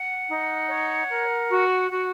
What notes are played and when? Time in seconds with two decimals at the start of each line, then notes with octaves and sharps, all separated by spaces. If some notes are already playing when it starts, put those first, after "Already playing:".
Already playing: F#5
0.27 D#4
0.68 C#5
1.08 A#4
1.48 F#4
1.89 F#4